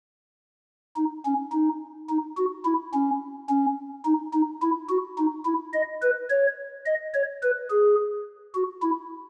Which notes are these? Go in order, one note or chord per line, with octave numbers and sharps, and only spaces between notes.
D#4
C#4
D#4
D#4
F#4
E4
C#4
C#4
D#4
D#4
E4
F#4
D#4
E4
D#5
B4
C#5
D#5
C#5
B4
G#4
F#4
E4